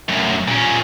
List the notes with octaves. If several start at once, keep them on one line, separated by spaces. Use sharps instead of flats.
F#2 A2
A#2 C#4